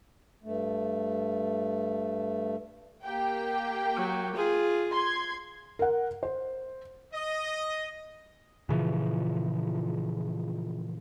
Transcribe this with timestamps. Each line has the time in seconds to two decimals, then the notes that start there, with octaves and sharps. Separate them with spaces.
0.44 G2 A3
3.03 A#3 G4 G5
3.96 F#3
4.36 F4 G#4
4.92 C6 G#6
5.79 A#4 F#5
6.23 C5
7.14 D#5
8.69 A#2 C#3 E3 F3